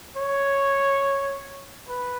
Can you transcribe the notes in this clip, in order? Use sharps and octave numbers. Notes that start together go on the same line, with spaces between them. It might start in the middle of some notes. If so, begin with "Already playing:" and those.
C#5
B4